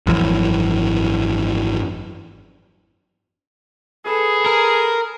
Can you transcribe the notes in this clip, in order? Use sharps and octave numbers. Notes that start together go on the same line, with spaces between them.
G#1 F#2 E3 F3
G#4 A4 B4
A#4